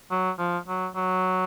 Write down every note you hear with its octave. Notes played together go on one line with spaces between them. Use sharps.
F#3
F3
F#3
F#3